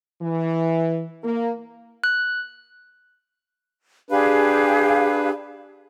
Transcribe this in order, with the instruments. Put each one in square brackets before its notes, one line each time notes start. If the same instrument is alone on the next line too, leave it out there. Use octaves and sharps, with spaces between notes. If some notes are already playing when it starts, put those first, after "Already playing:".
[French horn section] E3
A#3
[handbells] F#6
[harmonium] D4 B4 [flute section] G4 G#4 F5